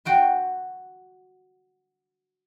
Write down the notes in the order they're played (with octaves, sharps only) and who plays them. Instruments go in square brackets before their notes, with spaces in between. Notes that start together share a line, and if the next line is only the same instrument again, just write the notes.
[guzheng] F#4 G5 C6